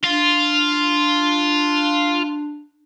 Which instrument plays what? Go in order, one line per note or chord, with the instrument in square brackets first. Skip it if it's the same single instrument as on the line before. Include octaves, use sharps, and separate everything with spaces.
[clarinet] D4 [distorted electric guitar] F4